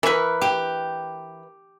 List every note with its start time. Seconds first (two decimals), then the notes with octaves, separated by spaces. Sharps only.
0.03 E3 A#4 B4 C#6
0.41 G4